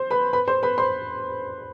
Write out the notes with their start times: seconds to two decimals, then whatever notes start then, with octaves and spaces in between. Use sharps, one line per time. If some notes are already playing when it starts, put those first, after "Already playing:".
Already playing: C5 C6
0.10 B4 B5
0.33 B4 B5
0.48 C5 C6
0.63 B4 B5
0.78 C5 C6